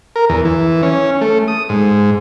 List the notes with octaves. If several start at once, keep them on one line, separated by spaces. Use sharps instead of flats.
A#4
E2
E3
C#4
A3
D#6
G#2